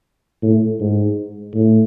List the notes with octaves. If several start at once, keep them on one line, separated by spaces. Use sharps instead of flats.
A2
G#2
A2